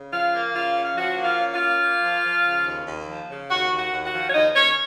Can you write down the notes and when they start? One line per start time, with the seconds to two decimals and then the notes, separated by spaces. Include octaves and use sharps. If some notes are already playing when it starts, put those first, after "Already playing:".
Already playing: C#3
0.12 F3 F4 F5
0.33 A#3
0.54 C#3 F4 F5
0.76 C#4
0.84 F5
0.96 F3 F#4 F#5
1.17 A#3
1.24 F4 F5
1.38 C#4
1.53 F4 F5
1.59 A#3
1.81 A#3
2.02 F3
2.23 F3
2.44 C#3
2.65 D#2
2.86 D#2
3.07 F3
3.28 C#3
3.49 D#2 F#4 F#5
3.71 D#2
3.78 F#4 F#5
3.92 D#2
4.05 F#4 F#5
4.12 F3
4.29 C#5
4.34 D#2 D#4 D#5
4.55 D#2 C#4 C#5